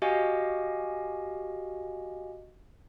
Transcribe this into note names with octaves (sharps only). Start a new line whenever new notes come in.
F#4 G4 D#5 F5 G#5